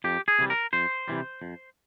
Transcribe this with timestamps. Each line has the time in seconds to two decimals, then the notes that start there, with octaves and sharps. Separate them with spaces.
0.04 F2 G4
0.28 G#4
0.39 C3 E3 G3
0.50 A#4
0.73 F2 C5
1.08 C3 E3 G3
1.42 F2